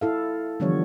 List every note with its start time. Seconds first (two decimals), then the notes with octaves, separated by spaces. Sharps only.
0.01 E4 A4 F5
0.60 D3 E3 F3 G3 B3 C#5